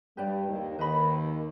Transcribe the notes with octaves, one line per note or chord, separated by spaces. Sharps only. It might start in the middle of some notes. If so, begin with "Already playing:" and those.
G2 G3 G4 B4 D5 G5
D#2 D#3
D#2 D#3 B4 D#5 B5